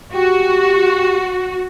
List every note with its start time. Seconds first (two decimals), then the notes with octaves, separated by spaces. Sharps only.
0.13 F#4 G4